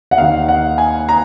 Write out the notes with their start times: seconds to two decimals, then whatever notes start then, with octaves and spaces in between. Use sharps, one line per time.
0.11 F#5
0.18 D#2 D#3 A#3 F5
0.48 F#5
0.78 G#5
1.09 A#5